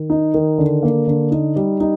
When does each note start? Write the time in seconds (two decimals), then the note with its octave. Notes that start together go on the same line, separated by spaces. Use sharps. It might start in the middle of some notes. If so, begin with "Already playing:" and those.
Already playing: D#3
0.10 D#4
0.34 D#3
0.58 D3
0.83 A#3
1.07 D3
1.31 D#4
1.56 G3
1.80 D#4